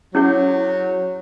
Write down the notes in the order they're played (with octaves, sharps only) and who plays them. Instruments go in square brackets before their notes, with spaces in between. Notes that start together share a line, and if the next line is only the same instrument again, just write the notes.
[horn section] F#3 [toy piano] C#4 E4 G#4 C#5 F#5